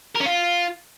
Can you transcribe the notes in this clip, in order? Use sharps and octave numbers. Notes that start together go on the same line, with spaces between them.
A#4
C#4
F4